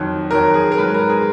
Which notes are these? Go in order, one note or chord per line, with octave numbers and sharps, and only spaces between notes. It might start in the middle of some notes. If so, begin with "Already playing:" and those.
Already playing: F2 D#3 F#3
F2 D#3 F#3 A#4
G#4
A#4
G#2 F#3 B4
A#4
G#4